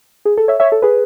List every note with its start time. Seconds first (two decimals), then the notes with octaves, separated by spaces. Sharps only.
0.25 G#4
0.38 A4
0.48 C#5 E5
0.60 C#5 E5
0.72 A4
0.82 G#4 B4